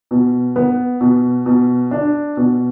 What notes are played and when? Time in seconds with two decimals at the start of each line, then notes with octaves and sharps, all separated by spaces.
0.11 B2
0.56 B3
1.01 B2
1.46 B2
1.91 D4
2.37 B2